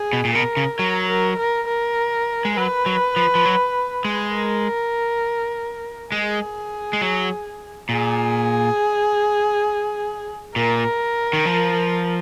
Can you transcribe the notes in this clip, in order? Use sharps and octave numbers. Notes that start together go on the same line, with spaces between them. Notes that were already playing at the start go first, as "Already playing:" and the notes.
Already playing: G#4
B2
A#2
B2 A#4
C#3
F#3 A#4
A#4
A#4
A#4
G#3
F#3 B4
F#3
F3
F3
F#3
G#3
A#4
G#3 G#4
G#3
F#3
A#2 G#4
A#2 A#4
D#3
F3